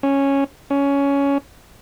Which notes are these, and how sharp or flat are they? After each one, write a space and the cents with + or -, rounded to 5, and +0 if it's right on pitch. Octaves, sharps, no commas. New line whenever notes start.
C#4 -5
C#4 +15